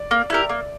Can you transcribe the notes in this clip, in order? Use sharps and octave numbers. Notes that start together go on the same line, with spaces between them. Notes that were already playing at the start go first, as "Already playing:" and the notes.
Already playing: D5
A#3
E4 G4 A#4
A#3